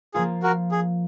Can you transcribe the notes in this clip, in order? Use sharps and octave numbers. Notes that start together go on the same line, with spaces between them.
F3 A#3 F4 G#4
F#4 A#4
G#4